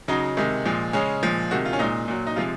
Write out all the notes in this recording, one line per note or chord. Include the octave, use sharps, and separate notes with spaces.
C#3 F#3 D#4
C3 D#3 G#3
A#2 F3 G#3
C#3 G#3 C#4
A#2 F3 G#3
C3 D#3 G#3 F#4
F4
C#4
A#2 G#3 D#4
A#2 F#3
D#4
C3 F3 G#3 F4